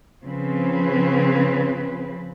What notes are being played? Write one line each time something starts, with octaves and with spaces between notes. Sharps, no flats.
C#3 F3 C4 B4